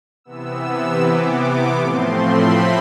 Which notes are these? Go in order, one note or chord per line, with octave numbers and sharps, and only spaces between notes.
C3 E3 B3 E6
C3 E3 B3 D6
A2 F3 A3 C4 C6
B5